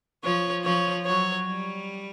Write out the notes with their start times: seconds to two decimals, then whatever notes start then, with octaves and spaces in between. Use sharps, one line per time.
0.24 F3 C#5
0.65 F3 C#5
1.06 F#3 C#5
1.47 G3